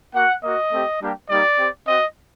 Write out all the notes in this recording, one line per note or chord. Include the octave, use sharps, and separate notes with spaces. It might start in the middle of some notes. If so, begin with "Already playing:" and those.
A#3 F#4 F#5
A#3 F#4 D#5
A3 C4 G4
G3 A#3 D4 G4
G3 A#3 D#4 G4 D5
C4 G4
C4 F#4 D#5